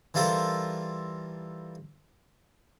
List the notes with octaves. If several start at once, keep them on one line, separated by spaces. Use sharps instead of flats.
E3 G3 F4 A4 A#4 C5